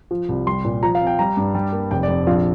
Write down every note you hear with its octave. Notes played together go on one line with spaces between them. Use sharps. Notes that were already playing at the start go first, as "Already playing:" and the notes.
F3
C2
G3 C6
A#2
F3 A#5
F5
C4
G5
G3 A#5
G2
G3
A#3
F1 G5
D5
F2
A#1 F4